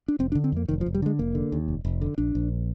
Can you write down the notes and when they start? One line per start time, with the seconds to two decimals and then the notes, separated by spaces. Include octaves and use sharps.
0.08 D4
0.19 F1 C4
0.32 D4
0.35 D3
0.44 C4
0.52 F2 A#3
0.69 F1 D#3
0.81 F3
0.86 F1
0.95 G3
1.02 D3 G#3
1.19 F1 A#3
1.35 D3
1.52 D#2
1.68 F1
1.85 F1
2.01 D3
2.18 A#1 D4
2.35 A#1